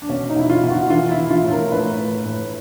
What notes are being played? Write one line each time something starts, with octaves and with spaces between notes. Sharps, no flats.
D4
B2 C#4
D#4
B2 E4
F4
B2
F#4
E3 F4
E4
E3
F4
A2
A#4
A2 B4
A2
A2